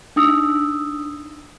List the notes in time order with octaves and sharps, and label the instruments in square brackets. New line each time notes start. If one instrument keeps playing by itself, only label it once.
[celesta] D4 D#4 D#6 E6